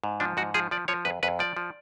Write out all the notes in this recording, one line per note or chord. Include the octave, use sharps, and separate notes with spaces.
G#2
F3 D4
G#2 F#4
F3 G#4
F3 D5
F3 C#5
F2 B4
F2 B4
F3 D5
F3